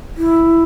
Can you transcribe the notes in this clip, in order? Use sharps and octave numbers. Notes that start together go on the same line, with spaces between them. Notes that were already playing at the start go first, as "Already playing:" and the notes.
E4